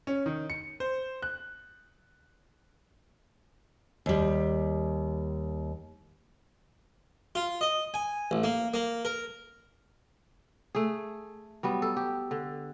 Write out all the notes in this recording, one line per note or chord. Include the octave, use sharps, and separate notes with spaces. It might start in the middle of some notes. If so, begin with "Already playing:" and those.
C#4
D#3
C#7
C5
F#6
D#2 G3
F4
D#5
G#5
A1
A#3
A#3
A#4
A3 G#4
F#3 G3 B3
A4
G4
D3